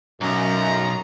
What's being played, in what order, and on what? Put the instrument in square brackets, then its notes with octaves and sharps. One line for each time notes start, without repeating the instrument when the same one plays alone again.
[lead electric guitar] B1 [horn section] F#2 [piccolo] A#5